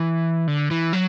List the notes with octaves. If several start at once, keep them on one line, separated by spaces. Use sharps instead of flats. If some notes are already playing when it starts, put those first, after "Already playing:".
Already playing: E3
D3
E3
F#3